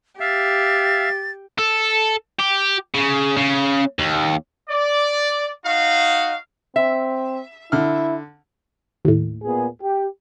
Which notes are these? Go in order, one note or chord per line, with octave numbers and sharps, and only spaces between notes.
G4 E5 F5 A6
A4
G4
C#3
C#3
D#2
D5
D#4 F#4 F5
C4 E5
D3 E4 F6
D#2 A2
A#2 B3 G#4
G4